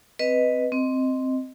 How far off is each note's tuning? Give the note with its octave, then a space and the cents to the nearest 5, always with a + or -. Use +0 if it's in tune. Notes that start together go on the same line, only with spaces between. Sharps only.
C4 +0 B4 +0 D#5 +0
C4 +0 D#5 +0